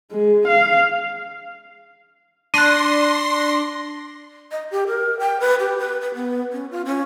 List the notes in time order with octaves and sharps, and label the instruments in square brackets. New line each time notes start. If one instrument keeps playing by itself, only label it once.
[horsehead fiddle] G#3
F5
[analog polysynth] D4 A#6 [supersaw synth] C6 [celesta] F#6 D#7
[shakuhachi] D#5
G4
A#4
G5
B4
G4
B4
B4
B3
C#4
F4
C#4